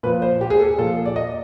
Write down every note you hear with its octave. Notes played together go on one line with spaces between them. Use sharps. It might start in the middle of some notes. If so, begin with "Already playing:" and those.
A#2 F3 B4
C5
G4
G#4
A4
A#2 F3 A4
D5
D#5